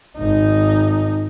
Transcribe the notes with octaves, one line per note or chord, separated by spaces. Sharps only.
G#1 D#4